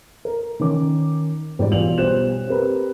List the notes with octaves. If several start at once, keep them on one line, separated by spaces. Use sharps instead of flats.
A#4
D#3 C#4 A#4 D6
G#2 G3 G4 D5
B1 E2 F4 F7 F#7
B1 G3 C5 F#6 E7
C4 G4 A#4 B4